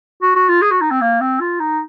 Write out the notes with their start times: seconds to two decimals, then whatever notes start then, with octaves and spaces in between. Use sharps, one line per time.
0.22 F#4
0.35 F#4
0.49 F4
0.61 G#4
0.71 F#4
0.81 D#4
0.91 C4
1.01 A#3
1.21 C4
1.40 F4
1.60 D#4